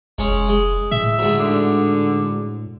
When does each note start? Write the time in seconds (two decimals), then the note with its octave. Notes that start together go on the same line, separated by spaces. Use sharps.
0.18 F1 G#3 C#4
0.48 G#3
0.92 A2 E5
1.19 D2 G#2
1.40 D3